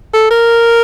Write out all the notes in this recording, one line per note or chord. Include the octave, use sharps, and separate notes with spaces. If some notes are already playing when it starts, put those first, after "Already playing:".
A4
A#4